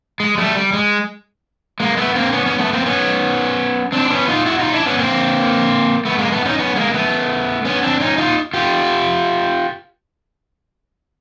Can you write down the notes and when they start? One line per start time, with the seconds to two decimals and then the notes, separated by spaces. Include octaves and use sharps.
0.20 G#3
0.38 G3 A3
0.55 G3
0.73 G#3
1.80 G#3 A#3
1.97 A3 B3
2.15 A#3 C4
2.33 B3 C#4
2.46 B3 C#4
2.59 A3 B3
2.73 A#3 C4
2.86 B3 C#4
3.92 C4 D4
4.05 D4
4.10 B3 C#4
4.28 D#4 F4
4.46 E4 F#4
4.59 D#4 F4
4.72 D4 E4
4.86 B3 C#4
4.99 A#3 C4
6.05 A3 B3
6.18 G#3 A#3
6.32 A3 B3
6.46 C#4 D#4
6.59 B3 C#4
6.76 G#3 A#3
6.94 A3 B3
7.65 B3 C#4
7.83 C4 D4
8.01 C#4 D#4
8.18 D#4 F4
8.54 F4 G4